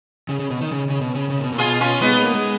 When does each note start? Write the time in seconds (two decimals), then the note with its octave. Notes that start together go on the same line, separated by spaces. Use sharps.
0.29 C#3
0.39 C#3
0.50 B2
0.61 D#3
0.71 C#3
0.89 C#3
1.01 B2
1.15 C#3
1.30 C#3
1.40 A#2
1.44 B2
1.52 A#2
1.58 B2 F4 G#4
1.80 C#4 F4
2.01 G#3 B3 D#4
2.13 G#3
2.23 A#3
2.35 G#3